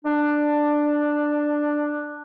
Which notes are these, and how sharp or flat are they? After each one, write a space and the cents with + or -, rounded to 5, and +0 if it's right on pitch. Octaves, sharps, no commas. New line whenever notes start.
D4 +10